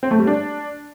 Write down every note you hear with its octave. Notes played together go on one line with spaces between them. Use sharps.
C4
A3
G3
D4